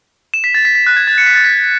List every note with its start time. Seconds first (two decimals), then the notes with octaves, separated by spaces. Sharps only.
0.34 E7
0.44 B6
0.54 A6
0.65 B6
0.75 B6
0.87 F#6
0.96 G#6
1.07 A6
1.18 C#7
1.26 B6
1.35 A6
1.44 B6